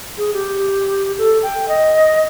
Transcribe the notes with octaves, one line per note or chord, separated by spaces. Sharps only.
G#4
G4
A4
G5
D#5